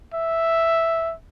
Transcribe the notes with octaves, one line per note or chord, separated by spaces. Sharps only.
E5